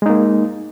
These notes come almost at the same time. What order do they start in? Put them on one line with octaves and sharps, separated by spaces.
G#3 D#4 A#3